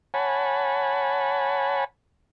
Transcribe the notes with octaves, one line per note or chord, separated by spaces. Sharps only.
C#5 F#5 G#5 A5 B5